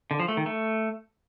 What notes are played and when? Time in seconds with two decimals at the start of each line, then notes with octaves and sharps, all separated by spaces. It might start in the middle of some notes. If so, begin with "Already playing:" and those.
0.11 D3
0.20 F3
0.28 A3
0.37 D#3
0.46 A3